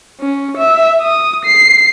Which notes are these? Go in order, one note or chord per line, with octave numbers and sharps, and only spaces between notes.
C#4
E5
D#6
C7